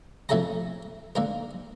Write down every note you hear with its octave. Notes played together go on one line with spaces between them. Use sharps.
F2 A2 A3 A4 A5 A#5
D3 A#3 A#4